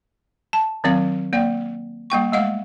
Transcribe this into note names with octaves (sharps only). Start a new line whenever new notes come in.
A5
D#3 F#3 C4 F5
A#3 D5 G5
G3 A#3 G5 C#6
G#3 A3 D#5 F5 F#5